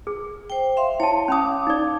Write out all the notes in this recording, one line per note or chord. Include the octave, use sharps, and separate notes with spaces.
G#4
C5 G5
E5 F5 C6
E4 C#5 A5
C#4 F5 B5 D6 D#6
D#4 D5